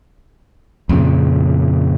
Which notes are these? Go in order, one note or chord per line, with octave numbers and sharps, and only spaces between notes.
F2 A#2 C#3